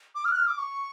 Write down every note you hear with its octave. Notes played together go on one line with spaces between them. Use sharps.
D6
F6
F#6
F6
D6
C#6